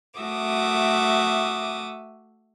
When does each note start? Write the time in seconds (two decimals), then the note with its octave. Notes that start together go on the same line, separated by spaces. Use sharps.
0.20 A3 F#4 E5 D6 D#6